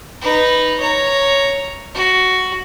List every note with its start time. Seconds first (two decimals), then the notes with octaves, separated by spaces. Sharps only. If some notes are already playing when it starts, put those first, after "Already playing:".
0.22 D#4 B4
0.80 C#5 A#5
1.95 F#4